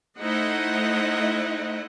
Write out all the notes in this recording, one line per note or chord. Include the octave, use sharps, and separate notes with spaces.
A3 D#4 E4 C5 D#5 F#5